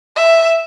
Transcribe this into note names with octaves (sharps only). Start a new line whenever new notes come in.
E5